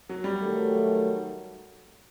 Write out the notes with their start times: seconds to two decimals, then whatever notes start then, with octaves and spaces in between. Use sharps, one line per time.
0.09 F#3
0.24 G3
0.40 D#3 F#3 A3